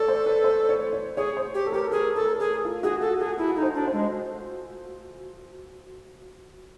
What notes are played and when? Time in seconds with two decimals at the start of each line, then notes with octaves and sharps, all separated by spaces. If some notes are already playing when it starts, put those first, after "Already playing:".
Already playing: A4 C#5 D5
0.08 C5
0.26 B4
0.44 C5
0.69 C#5
0.93 C#5
1.17 G#4 C#5
1.37 C5
1.54 G4
1.66 A4
1.72 G4 A#4
1.91 G#4 A#4
2.16 A4 A#4
2.39 G#4 A4
2.65 F4
2.83 F#4 G#4
3.01 G#4 A4
3.20 G#4 A4
3.38 E4 A4
3.56 D#4
3.62 C5
3.75 D4
3.87 C5
3.93 G#3